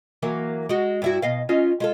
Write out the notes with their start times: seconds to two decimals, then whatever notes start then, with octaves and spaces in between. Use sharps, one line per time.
0.22 E3 F#3 A#3
0.69 G#3 F#4
1.02 G2 E4 F#4
1.22 B2 D#5 F5
1.49 C#4 F4 D#5
1.80 G#3 F4 A4